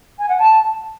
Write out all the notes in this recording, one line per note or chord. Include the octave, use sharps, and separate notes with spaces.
G#5
F#5
A5